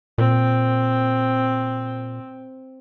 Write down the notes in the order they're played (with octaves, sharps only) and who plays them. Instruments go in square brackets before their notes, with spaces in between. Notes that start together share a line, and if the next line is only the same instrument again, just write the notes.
[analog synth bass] A#2 [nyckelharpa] C4